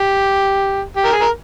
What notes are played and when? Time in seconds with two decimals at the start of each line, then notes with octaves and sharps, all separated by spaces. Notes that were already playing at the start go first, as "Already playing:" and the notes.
Already playing: G4
0.96 G4
1.05 A#4
1.13 G#4
1.21 A#4